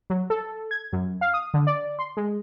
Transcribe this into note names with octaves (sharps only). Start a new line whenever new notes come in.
F#3
A4
G#6
F#2
F5
D#6
D3
D5
C6
G#3